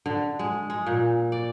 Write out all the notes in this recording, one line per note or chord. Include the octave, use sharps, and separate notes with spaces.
D3
G#3
G#3
A#2
D5